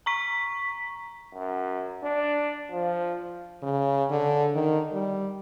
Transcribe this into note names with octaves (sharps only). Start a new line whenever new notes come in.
A#5 C#6 B6
F#2
D4
F3
C#3
D3
D#3
G3